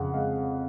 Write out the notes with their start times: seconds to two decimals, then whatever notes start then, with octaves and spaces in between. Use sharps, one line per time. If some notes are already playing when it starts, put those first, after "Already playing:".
Already playing: F2 C#3 F#5
0.14 G#3 F5